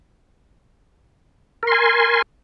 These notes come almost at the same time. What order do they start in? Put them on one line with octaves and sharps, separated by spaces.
A#4 C6 G#5